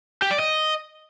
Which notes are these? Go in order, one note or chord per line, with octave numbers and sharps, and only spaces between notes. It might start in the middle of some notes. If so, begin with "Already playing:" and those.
G4
D5
D#5